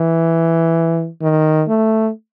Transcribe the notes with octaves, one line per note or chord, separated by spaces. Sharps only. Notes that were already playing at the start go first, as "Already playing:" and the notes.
Already playing: E3
D#3
A3